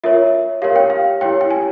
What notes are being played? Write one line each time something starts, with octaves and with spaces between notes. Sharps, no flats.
F4 A#4 C#5 E5
G4 A#4 C#5 F5
G5
F5
E4 G4 C#5 G5
G5
G#5